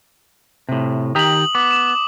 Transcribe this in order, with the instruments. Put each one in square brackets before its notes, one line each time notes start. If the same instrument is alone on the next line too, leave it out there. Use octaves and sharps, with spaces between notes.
[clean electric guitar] A2 C3
[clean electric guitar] D#3 G4 A#5 [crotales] D#6 F#7
[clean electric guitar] B3 [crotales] D6
[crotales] E7